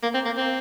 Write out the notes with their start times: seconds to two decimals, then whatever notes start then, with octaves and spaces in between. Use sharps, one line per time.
0.03 A#3
0.14 C4
0.26 A#3
0.37 C4